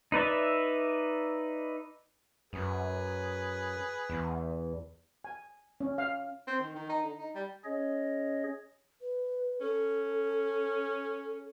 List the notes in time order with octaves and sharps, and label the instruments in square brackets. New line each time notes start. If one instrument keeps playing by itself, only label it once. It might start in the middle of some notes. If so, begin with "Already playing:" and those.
[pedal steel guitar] D#4 B4 D5 E5
[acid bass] F#2 [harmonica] G#4 B4
[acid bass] E2
[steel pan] G#5
C#4
F5
[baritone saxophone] C4
D#3
D#3
D#4
D3
D#4
G3
[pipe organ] C#4 G#4 C#5 D#5
[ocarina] B4
[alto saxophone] C#4 [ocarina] A4